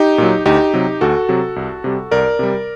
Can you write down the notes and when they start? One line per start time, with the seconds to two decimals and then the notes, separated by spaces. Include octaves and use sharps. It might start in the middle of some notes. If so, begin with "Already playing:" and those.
Already playing: D#4 G4
0.18 A#2 F#3
0.46 D2 D#4 G4
0.74 C3 F#3
1.01 D2 F#4 A4
1.29 C3 F#3
1.56 C2
1.84 C3 G3
2.11 C2 A#4 D5
2.39 C3 G3